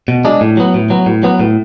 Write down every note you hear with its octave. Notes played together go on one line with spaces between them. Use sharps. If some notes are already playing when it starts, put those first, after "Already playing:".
B2
G#3 D4
A2
F#3 B3
A2
F#3 B3
A2
F#3 B3
A2